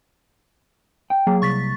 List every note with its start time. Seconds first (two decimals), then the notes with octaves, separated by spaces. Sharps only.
1.10 G5
1.27 F#3 A#3 G#4
1.42 C2 C#6 A6 B6